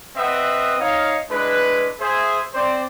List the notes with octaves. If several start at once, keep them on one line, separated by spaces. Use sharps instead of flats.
C4 B4 D#5 E5 F#5 D#6
D#4 C#5 D#5 F5
G#3 D4 E4 B4
G#4 C5 E5
C4 C5 D5